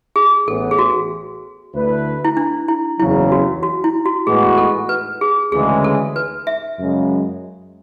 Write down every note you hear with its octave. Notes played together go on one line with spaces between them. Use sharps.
G#4
A1 A2 E3 B3 A4
G#4
F#4
D2 D3 A3 E4 B4
E4
D4
E4
F#1 E2 C#3 F#3 E4
F#4
F#4
E4
F#4
A2 E3 G#3 B3 F#4 G#4
A4
B4
G#4
D2 C#3 E3 G#3 G#4
A4
B4
E5
F#2 C#3 G#3